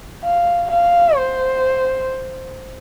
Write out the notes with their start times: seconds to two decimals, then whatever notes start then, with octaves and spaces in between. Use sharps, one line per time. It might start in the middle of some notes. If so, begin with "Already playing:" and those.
0.24 F5
0.70 F5
1.16 C5